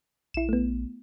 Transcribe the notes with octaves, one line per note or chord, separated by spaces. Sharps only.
A#1 E4 E7
A3 B3